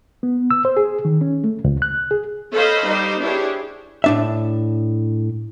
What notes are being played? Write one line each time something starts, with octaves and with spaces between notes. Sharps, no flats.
B3
E6
C5
G#4
D#3
C#4
A3
C#2
F#6
G#4
A4 C5 C#5 D#5 F5 B5
G3 D#4 C5
D4 E4 G4 G#4 C5 C#5
A2 D4 E5